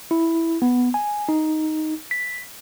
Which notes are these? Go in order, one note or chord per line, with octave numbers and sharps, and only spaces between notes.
E4
B3
G#5
D#4
B6